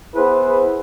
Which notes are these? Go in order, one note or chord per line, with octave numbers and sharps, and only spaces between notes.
B3 E4 G#4 B4 C5